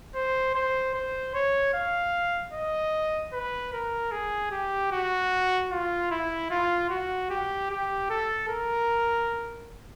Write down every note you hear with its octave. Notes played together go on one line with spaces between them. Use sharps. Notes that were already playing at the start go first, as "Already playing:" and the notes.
C5
C5
C5
C#5
F5
D#5
B4
A#4
G#4
G4
F#4
F4
E4
F4
F#4
G4
G4
A4
A#4